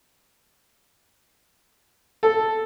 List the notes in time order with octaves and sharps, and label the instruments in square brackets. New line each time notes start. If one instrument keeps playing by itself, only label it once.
[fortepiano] A4